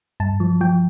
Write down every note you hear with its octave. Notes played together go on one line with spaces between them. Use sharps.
G2 A5
F3
F3 G5